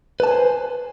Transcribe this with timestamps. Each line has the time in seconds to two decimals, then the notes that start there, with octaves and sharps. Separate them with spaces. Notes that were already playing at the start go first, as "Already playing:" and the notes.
0.20 B4
0.24 A5
0.27 G#5
0.31 C5